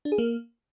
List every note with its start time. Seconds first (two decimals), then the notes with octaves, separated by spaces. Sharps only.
0.05 D4
0.12 G#4
0.18 A#3